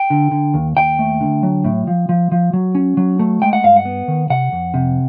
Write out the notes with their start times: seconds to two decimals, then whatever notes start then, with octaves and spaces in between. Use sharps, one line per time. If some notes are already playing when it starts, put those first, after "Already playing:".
Already playing: G5
0.10 D3
0.31 D3
0.54 D#2
0.77 D#2 G5
0.99 A3
1.21 D3
1.43 F#3
1.64 A2
1.87 F3
2.09 F3
2.32 F3
2.53 F#3
2.75 C#4
2.97 F#3
3.19 A3
3.42 G#3 G5
3.53 F#5
3.64 G2 F5
3.76 F#5
3.85 B3
4.08 D#3
4.30 C3 F#5
4.52 F2
4.74 C3